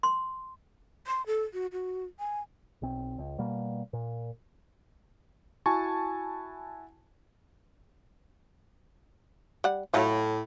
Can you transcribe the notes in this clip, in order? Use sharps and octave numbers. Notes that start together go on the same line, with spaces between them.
C6
C6
A4
F#4
F#4
G#5
B1 C4
C#2
B2 G3 A#3
A#2
E4 F#4 G#5 A5 C#6
G3 F#5
A2 F#3 A3 F4